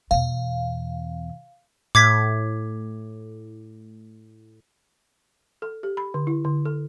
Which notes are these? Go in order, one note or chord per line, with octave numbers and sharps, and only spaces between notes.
E2 B2 F5
A2 D6 G#6 B6
A4
G4
B5
D3
E4
D3
A4